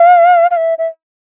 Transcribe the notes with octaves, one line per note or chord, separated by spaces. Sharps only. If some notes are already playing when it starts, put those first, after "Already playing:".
Already playing: F5
F5
E5
E5